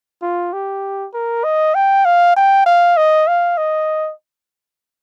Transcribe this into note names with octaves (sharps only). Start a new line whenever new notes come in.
F4
G4
A#4
D#5
G5
F5
G5
F5
D#5
F5
D#5